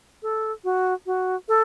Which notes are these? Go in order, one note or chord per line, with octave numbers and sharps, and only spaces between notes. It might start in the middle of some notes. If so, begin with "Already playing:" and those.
A4
F#4
F#4
A4